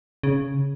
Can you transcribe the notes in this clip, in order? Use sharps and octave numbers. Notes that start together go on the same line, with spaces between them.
C#3